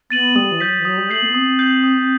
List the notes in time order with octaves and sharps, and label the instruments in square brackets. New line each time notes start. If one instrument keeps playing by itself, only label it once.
[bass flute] B3 [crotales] A6 D#7 F#7
[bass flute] G3 [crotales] D#6
[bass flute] E3
[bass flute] F#3 [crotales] G6 B6
[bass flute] E3
[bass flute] F#3 [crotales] D#6
[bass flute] G3
[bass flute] A3 [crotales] G6 C7 F#7
[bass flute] B3
[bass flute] C4 [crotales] D#6
[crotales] G6 C7 F#7
D#6